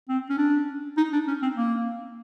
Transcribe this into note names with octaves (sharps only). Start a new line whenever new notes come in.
C4
C#4
D4
D#4
D4
C#4
C4
A#3